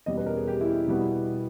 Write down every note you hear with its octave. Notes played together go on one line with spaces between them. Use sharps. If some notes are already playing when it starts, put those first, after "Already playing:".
E2 B2 G3 C#4 D#5
B4
A#4
G#4
G4
E4
E4
B2 G3 B3